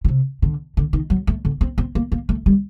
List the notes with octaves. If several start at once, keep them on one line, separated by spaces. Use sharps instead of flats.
D3
C3
D3
D3
D#3
F#3
A3
D3
C4
C4
A#3
A#3
A3
G3